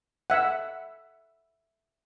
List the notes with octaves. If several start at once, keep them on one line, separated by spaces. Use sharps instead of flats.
E5 F#5